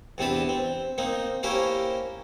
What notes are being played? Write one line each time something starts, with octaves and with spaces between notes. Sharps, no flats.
E2 C3 C4 D4 B4 A5
C4
A#3 C4 D#4
A#3 C#4 E4 G4 A#4 C5